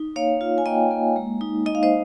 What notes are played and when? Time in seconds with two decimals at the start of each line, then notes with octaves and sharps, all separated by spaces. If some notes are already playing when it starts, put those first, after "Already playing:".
Already playing: D#4
0.16 A#3 C#5 F5
0.41 F4
0.58 G#5
0.66 A#3 D#5 G5
0.91 A#3
1.16 G#3
1.41 D#4
1.66 D#4 D#5
1.75 F5
1.83 C5 D#5